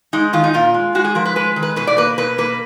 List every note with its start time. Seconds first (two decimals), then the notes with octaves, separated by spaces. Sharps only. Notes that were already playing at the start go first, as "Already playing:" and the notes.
0.13 G#3 D#4
0.33 D#3 F4
0.44 D#4
0.54 A#2 F4
0.74 G#3
0.95 G#3 F#4
1.05 G#4
1.15 F3 A#4
1.25 B4
1.36 G#3 B4
1.56 D#3
1.63 B4
1.76 B2 B4
1.87 D5
1.97 A#3 B4
2.18 B2 B4
2.38 A#3 B4